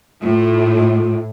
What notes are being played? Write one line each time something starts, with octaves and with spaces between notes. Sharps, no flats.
A2 F4